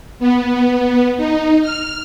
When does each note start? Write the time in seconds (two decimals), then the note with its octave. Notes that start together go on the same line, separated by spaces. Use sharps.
0.20 B3
1.17 D#4
1.62 F6